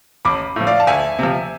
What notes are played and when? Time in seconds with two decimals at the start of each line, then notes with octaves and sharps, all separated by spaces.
0.25 A1 B5 D6
0.56 A2 F3
0.67 D5 F5
0.80 A5
0.87 D2 E5 G#5
1.19 C3 F3